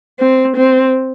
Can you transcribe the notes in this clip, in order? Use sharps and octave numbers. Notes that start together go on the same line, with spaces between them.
C4
C4